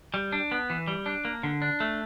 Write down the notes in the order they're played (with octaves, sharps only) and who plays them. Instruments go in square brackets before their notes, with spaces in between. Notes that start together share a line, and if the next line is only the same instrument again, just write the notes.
[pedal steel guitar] G3
D4
B3
E3
G3
D4
A#3
D3
D4
A3